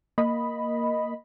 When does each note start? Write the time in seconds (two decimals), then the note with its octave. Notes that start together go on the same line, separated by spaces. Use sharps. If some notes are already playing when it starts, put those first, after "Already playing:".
0.18 A#3 D#5 B5